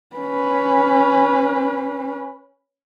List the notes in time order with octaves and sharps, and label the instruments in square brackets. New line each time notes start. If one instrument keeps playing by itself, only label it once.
[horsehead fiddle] C#4 B4